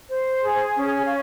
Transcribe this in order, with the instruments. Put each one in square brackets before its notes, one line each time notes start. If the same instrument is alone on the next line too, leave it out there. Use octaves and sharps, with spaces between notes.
[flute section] C5
G#4
C#4
F5